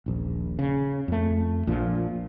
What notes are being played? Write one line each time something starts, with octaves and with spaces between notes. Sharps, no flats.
D#1 A#1
C#3
F2 A3
A#1 A#2 F3